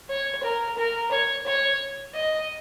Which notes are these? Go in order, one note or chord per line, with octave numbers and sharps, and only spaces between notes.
C#5
A#4
A#4
C#5
C#5
D#5